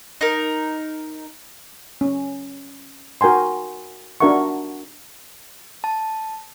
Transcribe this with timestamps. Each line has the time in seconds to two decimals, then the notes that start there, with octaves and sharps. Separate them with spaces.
0.21 D#4 A#4
2.01 C#4
3.21 F#4 A#4 G5 G#5 C6
4.20 D4 F#4 A#4 E5 F#5 C#6
5.84 A5